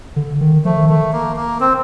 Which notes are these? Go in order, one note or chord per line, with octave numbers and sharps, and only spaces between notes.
D3
D#3
F3 A3
D#3
D#3 A3
A#3
A#3
C4